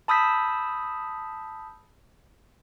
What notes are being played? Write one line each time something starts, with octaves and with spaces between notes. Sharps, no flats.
A5 B5 D#6 E6 G6 B6